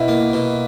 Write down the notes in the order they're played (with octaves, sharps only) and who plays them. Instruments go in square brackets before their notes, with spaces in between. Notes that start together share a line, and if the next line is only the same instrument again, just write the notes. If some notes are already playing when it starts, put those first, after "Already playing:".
Already playing: [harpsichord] B2 [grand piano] E4
[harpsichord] A#3
B2